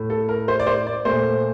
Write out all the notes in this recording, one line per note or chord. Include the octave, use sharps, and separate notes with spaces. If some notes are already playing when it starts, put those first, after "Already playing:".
Already playing: A2 A3
A4
A#4
C5
D5
C5
D5
A#2 A3 C5